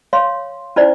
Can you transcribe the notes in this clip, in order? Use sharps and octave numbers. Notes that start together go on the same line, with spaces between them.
C#5 F5 C6
C#4 D#4 E4 C5 D5